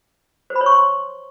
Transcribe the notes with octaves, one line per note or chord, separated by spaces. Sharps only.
C5
B5
C#5
C#6
C6